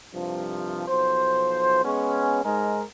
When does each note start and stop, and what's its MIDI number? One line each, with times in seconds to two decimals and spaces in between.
0.14 0.86 36
0.14 0.86 43
0.14 0.86 48
0.14 0.86 53
0.88 1.83 35
0.88 1.83 53
0.88 1.83 72
1.84 2.43 56
1.84 2.43 59
1.84 2.43 61
2.44 2.82 44
2.44 2.82 56
2.44 2.82 63
2.44 2.82 68
2.44 2.82 70